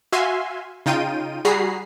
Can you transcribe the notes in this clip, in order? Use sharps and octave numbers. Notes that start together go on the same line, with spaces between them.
F#4 E5 F5 G#5 C6
C#3 D#4 F4 G5 D#7
G3 F#4 G#4 A#5 B5 C7